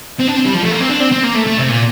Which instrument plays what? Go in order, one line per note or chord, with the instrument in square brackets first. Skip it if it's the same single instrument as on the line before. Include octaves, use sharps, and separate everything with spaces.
[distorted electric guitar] C4
D4
C4
G3
F3
A3
A#3
C4
D4
C4
C4
A#3
A3
A3
C3
A#2